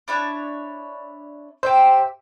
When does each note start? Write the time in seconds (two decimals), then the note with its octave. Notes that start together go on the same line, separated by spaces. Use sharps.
0.08 D4 E4 C#5
1.63 G4 C5 E5